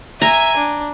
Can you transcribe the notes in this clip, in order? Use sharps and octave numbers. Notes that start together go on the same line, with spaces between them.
E5 G#5 A#5
D4